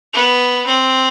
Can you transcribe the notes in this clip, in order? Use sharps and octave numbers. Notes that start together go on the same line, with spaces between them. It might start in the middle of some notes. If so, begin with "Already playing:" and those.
B3
C4